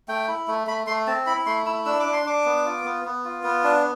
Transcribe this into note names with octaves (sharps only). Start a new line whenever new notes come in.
A3 G5
E4
A3
A3 B5
A3 C6
C4 A5
E4 B5
A3 C6
E4 E6
D4 E6
D6
D4
C6
D4 D6
B3
F4
B3
B3
F4
B3
D4